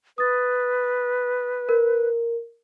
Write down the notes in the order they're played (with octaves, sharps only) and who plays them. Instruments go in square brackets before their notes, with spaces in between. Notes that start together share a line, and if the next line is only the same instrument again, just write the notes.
[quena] B4 [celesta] D#6 A6
[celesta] A#4